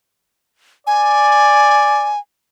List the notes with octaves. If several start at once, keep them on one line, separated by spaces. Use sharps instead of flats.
D5 G#5